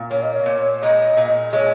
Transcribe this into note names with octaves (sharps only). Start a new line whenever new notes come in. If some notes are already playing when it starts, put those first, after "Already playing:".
Already playing: A#2
A#3 C#5
D#5
C#5
A#2
G#3 D#5
A#2
G#3 C#5